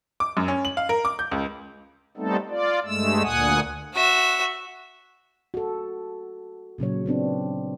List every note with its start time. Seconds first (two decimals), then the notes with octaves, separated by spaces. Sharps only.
0.20 D6
0.37 F#2
0.48 C#4
0.65 F#7
0.77 F5
0.89 A#4
1.05 D6
1.19 G6
1.31 C#2
2.17 G3 A3 B3 C4 D#4 A4
2.49 F4 D5
2.86 G2 G#3 A3 E6
3.23 D2 A#2 F#5 G#5 D#6
3.94 F#4 E5
5.54 F#4 A4
6.78 A#2 C#3 F#3 C#5
7.06 B3 C4 D4